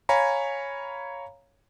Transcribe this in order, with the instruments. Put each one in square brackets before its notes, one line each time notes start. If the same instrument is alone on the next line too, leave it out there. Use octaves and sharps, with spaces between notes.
[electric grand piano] C#5 F5 G#5 A#5 B5